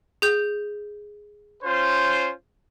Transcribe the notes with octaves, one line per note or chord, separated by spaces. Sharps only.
G#4 G6
C#4 F4 C5